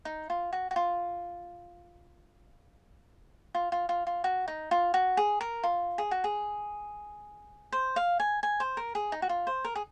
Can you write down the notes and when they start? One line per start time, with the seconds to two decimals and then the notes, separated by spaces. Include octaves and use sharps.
0.05 D#4
0.30 F4
0.53 F#4
0.71 F#4
0.76 F4
3.55 F4
3.72 F4
3.89 F4
4.07 F4
4.24 F#4
4.48 D#4
4.71 F4
4.94 F#4
5.17 G#4
5.41 A#4
5.63 F4
5.98 G#4
6.11 F#4
6.24 G#4
7.72 C5
7.96 F5
8.20 G#5
8.43 G#5
8.60 C5
8.77 A#4
8.95 G#4
9.12 D#4
9.22 F#4
9.29 F4
9.47 C5
9.65 A#4
9.75 G#4